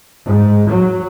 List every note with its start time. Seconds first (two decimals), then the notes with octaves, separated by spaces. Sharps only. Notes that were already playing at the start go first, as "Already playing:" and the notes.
0.25 G#2
0.69 F#3